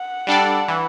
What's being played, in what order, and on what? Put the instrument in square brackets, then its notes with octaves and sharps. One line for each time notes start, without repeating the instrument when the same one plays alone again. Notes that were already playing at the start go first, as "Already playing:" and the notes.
Already playing: [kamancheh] F#5
[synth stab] G3 D4 A4 D5
E3